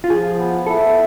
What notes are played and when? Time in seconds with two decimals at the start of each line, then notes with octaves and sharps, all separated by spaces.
0.04 F4
0.10 F3 G#4
0.39 B3
0.67 E4 A4